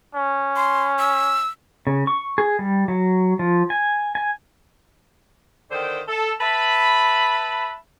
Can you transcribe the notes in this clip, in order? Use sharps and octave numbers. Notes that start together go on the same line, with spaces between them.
C#4
C6
E6
C#3
C#6
G#4
G3
F#3
F3
G#5
G#5
D3 D#3 C5 G5
A4
B4 E5 A5 B5